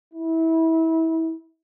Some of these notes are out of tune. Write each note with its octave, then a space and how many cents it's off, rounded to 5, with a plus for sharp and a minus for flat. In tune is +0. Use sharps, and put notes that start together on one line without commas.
E4 -25